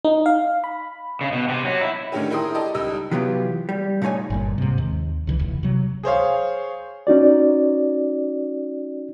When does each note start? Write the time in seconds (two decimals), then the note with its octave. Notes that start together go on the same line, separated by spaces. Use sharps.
0.05 D#4
0.26 F5
0.64 B5
1.21 C#3
1.33 B2
1.48 C3
1.65 F#3
1.81 E4
2.12 A2 D3 D#3 C#4 G4 G#4
2.30 E4 G#4 A#4 G5 C6 D#6
2.54 G4 A4 D5 D#5
2.75 C#2 G3 D#4 E6
3.11 C3 E3 F#3 B3 F4 G4
3.69 G3
4.02 A#2 A3 D#4 C#5 G#5
4.30 G1 G2 A#2
4.58 G#2 C3
4.78 D#2
5.27 C#2 C#3 E3
5.39 F1 E2
5.63 C3 F#3
6.03 G#4 C5 C#5 F5
7.07 C#4 D#4 F#4 D5